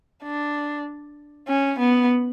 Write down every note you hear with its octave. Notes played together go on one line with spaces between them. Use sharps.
D4
C#4
B3